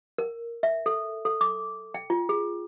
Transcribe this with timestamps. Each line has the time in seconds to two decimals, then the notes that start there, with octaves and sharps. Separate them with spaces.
0.18 A#4
0.63 E5
0.86 A4
1.25 A4
1.41 D6
1.94 G5
2.10 F4
2.29 G#4